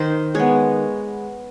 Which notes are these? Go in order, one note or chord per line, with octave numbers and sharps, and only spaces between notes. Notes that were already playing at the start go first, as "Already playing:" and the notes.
Already playing: D#3 C5
G#3 B3 C#5